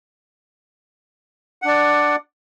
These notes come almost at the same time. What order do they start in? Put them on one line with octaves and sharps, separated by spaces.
F#5 D4 D5